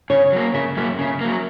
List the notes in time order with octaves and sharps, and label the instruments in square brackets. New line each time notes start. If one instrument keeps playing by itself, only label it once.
[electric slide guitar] C#3 [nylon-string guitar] C#5
[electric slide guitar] F#3 A#3
[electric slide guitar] C#3 [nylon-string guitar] E5
[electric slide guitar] F#3 A#3 [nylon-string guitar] E5
[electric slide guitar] C#3 [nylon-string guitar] E5
[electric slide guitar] F#3 A#3